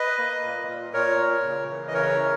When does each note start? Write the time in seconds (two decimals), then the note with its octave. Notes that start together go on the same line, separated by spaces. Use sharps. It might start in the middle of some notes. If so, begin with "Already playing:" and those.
Already playing: B4 D#5
0.18 A#3
0.43 A#2
0.68 A#2
0.93 A#2 A#4 C#5
1.19 A#2
1.43 C#3
1.69 E3
1.88 D#5
1.94 C#3 A#4 C#5
2.19 E3